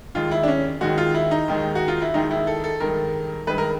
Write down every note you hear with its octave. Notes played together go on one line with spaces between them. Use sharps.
D#2 D#3 G#3 F4
E4
D4
C#4
D#2 D#3 G#3 F#4
F4
E4
D#4
D#2 D#3 G#3
F#4
F4
E4
D#2 D#3 G#3 D#4
E4
A4
A4
G2 D#3 G#3 A#4
G2 D#3 G#3 B4
A#4